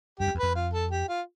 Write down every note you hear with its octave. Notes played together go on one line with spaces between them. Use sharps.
G2 G4
F2
E2
F2 B4
F4
A4
G4
F4